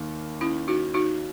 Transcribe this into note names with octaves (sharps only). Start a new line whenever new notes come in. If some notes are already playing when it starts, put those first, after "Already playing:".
Already playing: D#2 D#3 A#3
C#4 E4
D#4 F#4
D#4 F#4